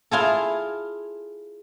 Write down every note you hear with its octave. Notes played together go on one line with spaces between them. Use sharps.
E4 F4 G#4 A4